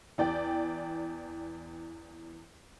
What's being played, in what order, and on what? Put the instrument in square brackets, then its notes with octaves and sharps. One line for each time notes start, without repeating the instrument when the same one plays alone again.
[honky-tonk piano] E2 D5 G5